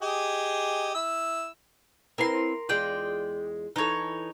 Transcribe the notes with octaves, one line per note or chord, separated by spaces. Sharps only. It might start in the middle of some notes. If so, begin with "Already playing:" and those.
G4 G#4 D#5
E4 E6
C4 E4 A#4 B4 C6
E2 G#3 F4 D5 G5
E3 D#4 A4 C#5